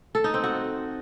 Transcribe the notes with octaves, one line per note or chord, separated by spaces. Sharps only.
A4
D#4
C4
F#4